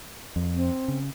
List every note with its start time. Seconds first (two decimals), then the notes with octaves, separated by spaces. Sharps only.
0.36 F2
0.55 C4
0.88 C#3